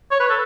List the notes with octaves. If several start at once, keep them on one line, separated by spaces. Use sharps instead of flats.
C#5
B4
A4